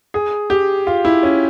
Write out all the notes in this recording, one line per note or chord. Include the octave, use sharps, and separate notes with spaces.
G#4
G4
F4
E4
C#4